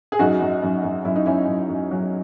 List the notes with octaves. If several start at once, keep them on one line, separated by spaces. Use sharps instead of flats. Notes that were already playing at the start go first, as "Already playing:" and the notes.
G#4
F#2 D#4 F#4
F#2
F#2
F#2
F#2 E4
D#4
F#2 C#4 E4
F#2
F#2
F#3